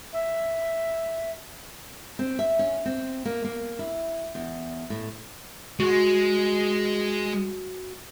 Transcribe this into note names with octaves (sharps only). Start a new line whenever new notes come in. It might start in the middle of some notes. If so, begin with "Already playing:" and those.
E5
C4
E5
C#4
C4
A#3
A#3
E4
E2
A2
G#3 F#4